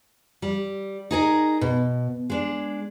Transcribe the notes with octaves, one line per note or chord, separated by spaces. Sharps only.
G3
D#4 G#4 A#4
B2
G#3 D4